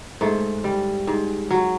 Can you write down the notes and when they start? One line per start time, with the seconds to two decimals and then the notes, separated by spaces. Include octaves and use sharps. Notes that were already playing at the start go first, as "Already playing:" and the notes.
0.21 G#2 A3
0.64 G3
1.07 G#2
1.50 F#3